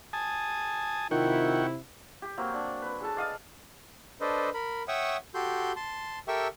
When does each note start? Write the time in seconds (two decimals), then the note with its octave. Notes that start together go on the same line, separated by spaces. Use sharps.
0.13 G#5 A5 D#6
1.11 C3 D#3 E4 F4 F#5 G5 C#6
2.22 G4
2.37 F#3 A#3 C4
2.54 D4
2.82 B4
3.01 G#4 A4 A5
3.17 D5 D#5 F5 D#6
4.21 D4 A4 B4 C5 D#5
4.54 A#4 B5
4.88 C#5 E5 F#5 G5 C#6 D#6
5.34 F#4 G4 A4 C6 G6
5.76 A5 C6
6.28 G4 A4 A#4 E5 G5 C#6